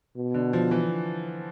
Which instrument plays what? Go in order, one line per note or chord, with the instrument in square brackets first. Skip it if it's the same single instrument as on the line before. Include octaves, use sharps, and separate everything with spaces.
[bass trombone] B2
[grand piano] D3
F3
E3